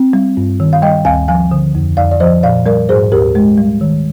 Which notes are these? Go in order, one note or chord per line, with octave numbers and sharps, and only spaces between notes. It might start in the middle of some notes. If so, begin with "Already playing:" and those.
Already playing: C4
G3
G2
D#3
F5
G3 D#5 G5
D2 F5 G#5
F3 F5 G#5
D3
F2
F2 D5 F5
D5
F3 C5 D#5
A#2 D5 F5
G3 A#4 D5
G#2 G#4 C5
D2 G4 A#4
G#3
G3
D#3